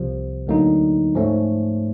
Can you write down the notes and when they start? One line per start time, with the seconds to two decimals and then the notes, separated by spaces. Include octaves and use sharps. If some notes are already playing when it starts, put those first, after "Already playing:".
Already playing: C2 C3 F3
0.47 D2 D3 F#3 A#3 D#4
1.15 G#2 F3 A3 C#4